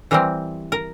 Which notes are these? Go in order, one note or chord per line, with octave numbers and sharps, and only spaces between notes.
E3 G3 C4 A#4
A#4